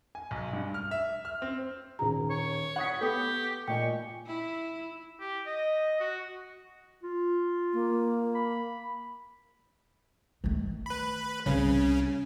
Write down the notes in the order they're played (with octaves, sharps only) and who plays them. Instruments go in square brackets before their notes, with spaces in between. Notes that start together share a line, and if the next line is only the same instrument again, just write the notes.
[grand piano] G#5
B1
G2
F6
E5
F6
C4
[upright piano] D#1 D#3 G#4 [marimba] A#5
[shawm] C#5
[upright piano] F#5 D#6 B6
[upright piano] B3 [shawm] G4 [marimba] A4 G5 D#6
[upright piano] A#2 D#5 G#5 [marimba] G5 [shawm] C#6
[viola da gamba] E4
[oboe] G4
D#5
F#4
[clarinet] F4
[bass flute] A#3
[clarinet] B5
[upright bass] D#3 A3
[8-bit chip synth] B4 B5
[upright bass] C2 [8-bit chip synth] C#3 C#4